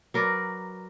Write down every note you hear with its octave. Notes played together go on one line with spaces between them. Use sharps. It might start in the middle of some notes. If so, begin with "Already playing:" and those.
F#3 A#4 B4 D5